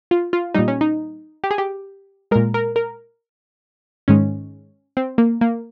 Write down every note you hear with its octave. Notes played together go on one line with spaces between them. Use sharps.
F4
F4
A#2 G3 D#4
C#4
D#4
G4
G#4
G4
A#2 G#3 A#4
A#4
A#4
G#2 D#3 G#3 C#4
C4
A#3
A#3